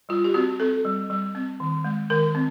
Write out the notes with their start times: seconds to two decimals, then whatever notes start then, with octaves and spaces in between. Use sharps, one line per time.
0.09 G3 F4
0.24 G4
0.34 C4 F#4
0.60 C4 A4
0.85 G3
1.10 G3
1.35 C4
1.60 D#3
1.84 G#3
2.10 D#3 A#4
2.35 C4